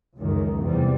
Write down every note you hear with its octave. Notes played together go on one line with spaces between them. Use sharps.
C#2 F#2 D#3
E2 C3 G3